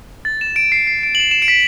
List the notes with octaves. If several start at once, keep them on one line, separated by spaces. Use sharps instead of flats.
A6
E7
D7
C7
C7
D7
F#7
E7
E7
D7
B6